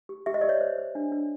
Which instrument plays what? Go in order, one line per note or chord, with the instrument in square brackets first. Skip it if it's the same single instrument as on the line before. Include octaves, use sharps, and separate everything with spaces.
[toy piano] G4
G4 E5
D#5
G4 D5
C#5 D#5
C5
C5
D4
D4